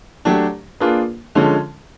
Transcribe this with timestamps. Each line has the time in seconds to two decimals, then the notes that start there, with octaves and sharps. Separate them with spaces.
0.25 F#3 A3 D4 G4
0.80 A#3 D4 F4 G#4 B4
1.35 D3 F3 G#3 C#4